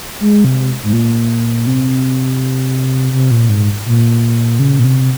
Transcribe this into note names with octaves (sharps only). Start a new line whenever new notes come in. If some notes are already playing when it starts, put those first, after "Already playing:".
G#3
C3
G#2
A#2
C3
C3
A#2
G#2
A#2
C#3
A#2
C3